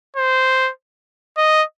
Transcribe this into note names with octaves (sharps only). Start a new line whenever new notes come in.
C5
D#5